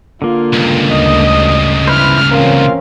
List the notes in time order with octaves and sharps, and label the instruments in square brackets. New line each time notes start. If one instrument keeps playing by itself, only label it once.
[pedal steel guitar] D3 A#3 [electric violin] F4
[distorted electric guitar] C#2 G2
[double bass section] D2 [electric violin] D#5 D#6
[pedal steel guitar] E4 B4 C5 [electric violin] F6
[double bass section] E3 C4 C#4 [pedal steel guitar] A#3 F4 [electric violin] A#4 F5